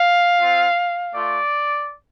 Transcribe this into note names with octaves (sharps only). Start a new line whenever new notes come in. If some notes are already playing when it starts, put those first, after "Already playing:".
Already playing: F5
C4 F4
A3 F4 D5